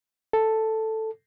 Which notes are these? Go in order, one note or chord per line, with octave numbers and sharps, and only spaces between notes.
A4